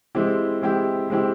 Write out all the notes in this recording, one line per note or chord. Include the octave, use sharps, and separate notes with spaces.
E3 G#3 C4 E4 G4
E3 G#3 C4 E4 G4
E3 G#3 C4 E4 G4